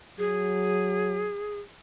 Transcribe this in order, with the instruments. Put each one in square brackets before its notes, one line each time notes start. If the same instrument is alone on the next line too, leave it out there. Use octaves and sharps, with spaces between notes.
[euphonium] F#3 [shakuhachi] G#4